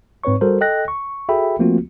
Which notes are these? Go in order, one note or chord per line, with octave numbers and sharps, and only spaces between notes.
G#2 C4 B4 C#5 C#6
G3 F#4 A4 A#4 C5
A4 D#5 G5 F#6 A#6
C#6
F#4 G#4 A4 E5 G5 B5
F3 A3 A#3 C4 F4 F#4